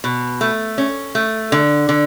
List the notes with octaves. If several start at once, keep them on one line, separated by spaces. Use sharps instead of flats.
B2
A3
C#4
A3
D3
D3